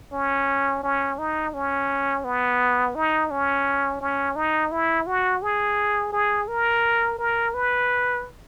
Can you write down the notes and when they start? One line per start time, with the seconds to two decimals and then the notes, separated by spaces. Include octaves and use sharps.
0.12 C#4
0.84 C#4
1.18 D#4
1.54 C#4
2.24 B3
2.95 D#4
3.31 C#4
4.01 C#4
4.36 D#4
4.72 E4
5.07 F#4
5.43 G#4
6.12 G#4
6.48 A#4
7.19 A#4
7.54 B4